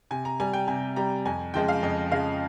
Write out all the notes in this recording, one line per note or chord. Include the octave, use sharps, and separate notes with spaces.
C3 G#5
A#5
G3 G#5
G5
C3 G#5
G3 A#5
F2 G#5
C#3 F3 G#3 G5
F5
F2 D#5
C#3 F3 G#3 F5